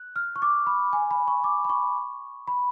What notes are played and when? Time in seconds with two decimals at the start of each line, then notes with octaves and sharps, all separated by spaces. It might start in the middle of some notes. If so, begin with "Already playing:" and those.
Already playing: F#6
0.16 F6
0.36 C#6
0.42 D6
0.67 B5
0.93 G#5
1.11 B5
1.28 C#6
1.44 D6
1.65 B5
1.69 C#6
2.48 B5